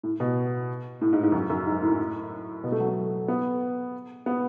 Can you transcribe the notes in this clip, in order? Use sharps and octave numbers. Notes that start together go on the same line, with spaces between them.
A2
B2
A2
G#2
G#2
F#2
F#2
G#2
A2
B2
A3
F#3
A3
B3
B3